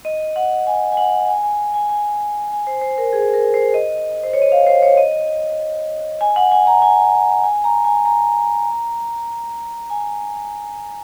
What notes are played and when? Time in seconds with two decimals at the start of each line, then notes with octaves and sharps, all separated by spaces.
0.05 D#5
0.36 F#5
0.67 G#5
0.92 G#5
0.97 F#5
1.28 G#5
1.43 G#5
1.74 G#5
1.89 G#5
2.51 G#5
2.67 C5
2.82 C5
2.98 A#4
3.13 G#4
3.34 A#4
3.54 C5
3.74 D#5
4.23 C5
4.33 C#5
4.42 D#5
4.52 F5
4.67 C5
4.83 C#5
4.98 D#5
6.21 G#5
6.36 F#5
6.52 G#5
6.67 A#5
6.82 G#5
7.43 G#5
7.64 A#5
7.85 G#5
8.06 A#5
9.90 G#5